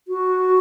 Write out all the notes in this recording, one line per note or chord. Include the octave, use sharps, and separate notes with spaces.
F#4